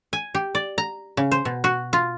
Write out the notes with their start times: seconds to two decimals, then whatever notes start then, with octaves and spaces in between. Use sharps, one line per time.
0.13 G#5
0.35 G4
0.55 D5
0.78 A#5
1.17 C#3
1.31 C5
1.45 B2
1.64 F#4
1.93 F4